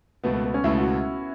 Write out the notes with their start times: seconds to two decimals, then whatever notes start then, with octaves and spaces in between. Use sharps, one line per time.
0.24 C#2 B2 A3 B3
0.34 B3
0.44 B3
0.54 C#4
0.64 C#2 B2 A3 E4
0.78 F#4